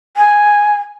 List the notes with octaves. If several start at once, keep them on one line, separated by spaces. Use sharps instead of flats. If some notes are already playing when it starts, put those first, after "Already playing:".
G#5